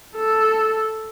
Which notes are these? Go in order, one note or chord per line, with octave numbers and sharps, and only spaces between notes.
A4